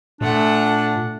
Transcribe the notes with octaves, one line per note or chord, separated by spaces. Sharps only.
A#2 A3 D4 F#5